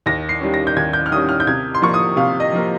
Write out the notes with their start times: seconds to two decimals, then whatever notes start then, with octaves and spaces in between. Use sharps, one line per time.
0.06 D#2 A#6
0.29 C7
0.41 D#3 G3 C#4
0.54 A#6
0.67 G6
0.76 D#2 G#6
0.93 G6
1.06 F6
1.11 D#3 G3 C#4 D#6
1.29 F6
1.40 G6
1.47 C3 G#6
1.74 C6
1.82 F3 A#3 C#6
1.94 D#6
2.16 C3 F5
2.40 D#5
2.52 F3 A#3